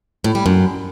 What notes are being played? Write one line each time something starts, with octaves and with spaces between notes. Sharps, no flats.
A2
G3
F#2